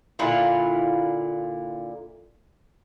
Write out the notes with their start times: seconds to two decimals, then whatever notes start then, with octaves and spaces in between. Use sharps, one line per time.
0.19 A#2 D3 E4 F4